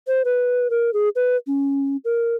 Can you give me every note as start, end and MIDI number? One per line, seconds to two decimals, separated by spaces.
0.08 0.22 72
0.25 0.70 71
0.70 0.90 70
0.94 1.09 68
1.16 1.36 71
1.47 1.96 61
2.05 2.36 70